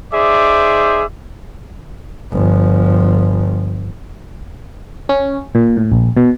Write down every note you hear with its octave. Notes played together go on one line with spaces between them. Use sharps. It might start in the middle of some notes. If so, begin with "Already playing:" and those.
D#4 G#4 C5 D5 E5 D6
G1 F3
C#4
A#2
A2
A#1
B2